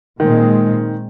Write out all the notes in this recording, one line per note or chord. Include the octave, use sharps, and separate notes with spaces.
A#2 D#3 G#3 C4